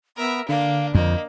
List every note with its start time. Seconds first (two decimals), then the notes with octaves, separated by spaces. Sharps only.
0.18 B3 A#4 E5
0.49 D3 A#3 D4 F5
0.95 F2 A#3 D#5